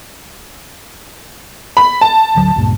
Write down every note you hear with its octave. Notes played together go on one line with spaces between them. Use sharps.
B5
A5
G#1 D2 F#3
C#2 G2 A#2